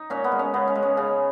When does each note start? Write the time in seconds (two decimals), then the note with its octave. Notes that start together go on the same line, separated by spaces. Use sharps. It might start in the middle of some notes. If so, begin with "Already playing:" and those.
Already playing: D#4
0.10 A#2 C#4
0.24 B3
0.32 G#3
0.39 C#4
0.54 C#3 B3
0.68 C#4
0.75 G#3
0.83 C#4
0.97 C#3 C#4